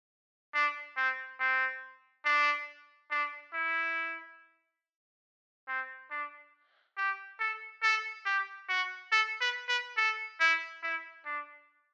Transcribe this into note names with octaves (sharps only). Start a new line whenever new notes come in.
D4
C4
C4
D4
D4
E4
C4
D4
G4
A4
A4
G4
F#4
A4
B4
B4
A4
E4
E4
D4